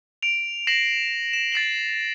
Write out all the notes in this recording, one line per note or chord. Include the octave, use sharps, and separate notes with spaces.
D7 F7
A#6 C7 E7 F#7
E7
A6 C7 E7 F#7